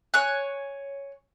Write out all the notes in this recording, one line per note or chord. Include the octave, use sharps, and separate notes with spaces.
C#5 G#5 F#6